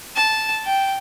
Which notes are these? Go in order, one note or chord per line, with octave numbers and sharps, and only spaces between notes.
A5
G5